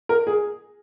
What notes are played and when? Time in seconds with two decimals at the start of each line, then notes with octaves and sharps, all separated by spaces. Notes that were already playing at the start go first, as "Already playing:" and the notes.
0.09 A#4
0.27 G#4